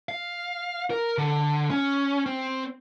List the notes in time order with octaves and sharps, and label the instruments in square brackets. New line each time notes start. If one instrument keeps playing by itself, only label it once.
[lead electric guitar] F5
A#4
D3
C#4
C4